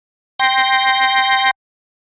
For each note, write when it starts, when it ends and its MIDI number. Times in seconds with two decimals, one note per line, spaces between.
0.39 1.51 79
0.39 1.51 84
0.39 1.51 94